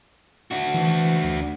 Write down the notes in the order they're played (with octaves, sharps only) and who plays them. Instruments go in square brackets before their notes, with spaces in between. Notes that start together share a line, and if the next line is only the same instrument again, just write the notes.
[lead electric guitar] D4 F#4
[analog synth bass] E3
D2